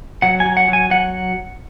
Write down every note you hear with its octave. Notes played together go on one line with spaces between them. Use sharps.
F#3 F#5
G#5
F#3
F#5
F#3 G#5
F#3 F#5